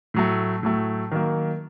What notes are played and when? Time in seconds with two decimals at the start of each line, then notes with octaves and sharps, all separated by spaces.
0.14 A2 F#3 A3
0.63 A2 F#3 A3
1.11 D#3 F#3 A#3